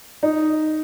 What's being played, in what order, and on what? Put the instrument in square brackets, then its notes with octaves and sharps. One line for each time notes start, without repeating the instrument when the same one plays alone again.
[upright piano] D#4